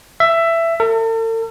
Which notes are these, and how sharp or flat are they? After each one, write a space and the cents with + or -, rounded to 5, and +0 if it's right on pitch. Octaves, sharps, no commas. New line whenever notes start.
E5 +15
A4 +45